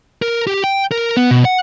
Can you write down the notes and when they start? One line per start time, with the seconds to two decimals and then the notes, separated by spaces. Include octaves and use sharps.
0.22 A#4
0.47 G4
0.64 G5
0.92 A#4
1.17 B3
1.31 B2
1.45 F#5